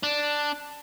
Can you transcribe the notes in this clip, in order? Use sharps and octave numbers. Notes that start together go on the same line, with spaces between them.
D4